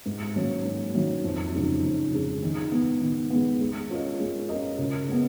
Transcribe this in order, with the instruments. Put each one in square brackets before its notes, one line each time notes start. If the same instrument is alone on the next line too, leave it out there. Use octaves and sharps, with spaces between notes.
[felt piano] G#2
D#3 F#3 A#3 C#4
G#2
D#3 F#3 A#3 C#4
F2
C#3 G#3 D#4 G#4
F2
C#3 G#3 D#4 G#4
D#3
G#3 B3
D#3
G#3 B3
G#3
C#4 F4 A#4 D#5
G#3
C#4 F4 A#4 D#5
C#3
G#3 B3